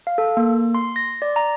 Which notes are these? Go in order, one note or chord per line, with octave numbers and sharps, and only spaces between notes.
F5
A4
A#3
C6
A#6
D5
A#5